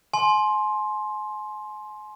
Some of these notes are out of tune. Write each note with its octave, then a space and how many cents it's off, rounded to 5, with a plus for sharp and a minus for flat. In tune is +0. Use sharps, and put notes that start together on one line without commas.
G#5 +35 C6 +10